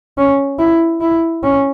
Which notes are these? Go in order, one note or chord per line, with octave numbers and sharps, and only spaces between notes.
C#4
E4
E4
C#4